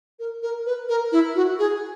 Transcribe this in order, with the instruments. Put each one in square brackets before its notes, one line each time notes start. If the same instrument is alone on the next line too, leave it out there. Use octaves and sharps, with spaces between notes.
[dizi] A#4
A#4
B4
A#4
E4
F#4
G#4